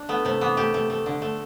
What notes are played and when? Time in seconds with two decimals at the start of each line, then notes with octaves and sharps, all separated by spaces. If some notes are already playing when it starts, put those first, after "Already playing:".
Already playing: D4
0.09 A3 B3
0.25 C3 A3
0.41 E3 B3
0.57 A3 G4
0.74 A3
0.90 A3
1.06 D3
1.22 A3